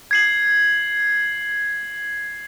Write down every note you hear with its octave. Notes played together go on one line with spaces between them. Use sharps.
G#6 C7 F#7